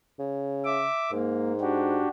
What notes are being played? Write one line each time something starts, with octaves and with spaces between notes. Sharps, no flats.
C#3
E5 D6
G#2 A#3
D4 F#4 G4